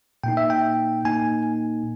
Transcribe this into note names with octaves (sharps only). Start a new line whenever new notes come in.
A#2 A#3 D#4 G5
E5
G5
A#2 A#3 D#4 G#5